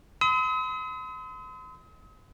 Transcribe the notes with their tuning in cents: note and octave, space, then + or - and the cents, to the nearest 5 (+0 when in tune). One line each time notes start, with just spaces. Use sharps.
C6 -40 D#6 +45